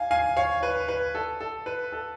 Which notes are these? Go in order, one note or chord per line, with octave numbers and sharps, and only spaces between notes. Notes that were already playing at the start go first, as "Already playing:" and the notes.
Already playing: F5 G#5
F5 G#5
C#5 F5
B4
B4
A4
A4
B4
A4